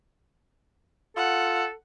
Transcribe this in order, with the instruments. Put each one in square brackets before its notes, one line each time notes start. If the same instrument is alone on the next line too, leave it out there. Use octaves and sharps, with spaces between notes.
[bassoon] F4 [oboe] A4 [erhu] F#5